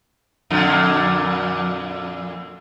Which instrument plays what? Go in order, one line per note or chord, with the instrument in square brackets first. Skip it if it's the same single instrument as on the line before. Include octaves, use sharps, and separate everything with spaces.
[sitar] F2 A#2 D3